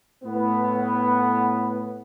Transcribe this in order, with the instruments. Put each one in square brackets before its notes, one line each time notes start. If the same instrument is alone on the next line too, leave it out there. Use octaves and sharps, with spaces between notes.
[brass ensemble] A2 B3